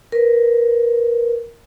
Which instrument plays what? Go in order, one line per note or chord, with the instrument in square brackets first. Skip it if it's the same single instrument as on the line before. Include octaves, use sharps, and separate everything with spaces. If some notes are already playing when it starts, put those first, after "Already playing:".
[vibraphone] A#4 B4